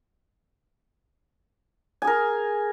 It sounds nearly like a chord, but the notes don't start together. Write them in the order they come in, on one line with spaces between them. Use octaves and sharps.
G#5 G#4 A#4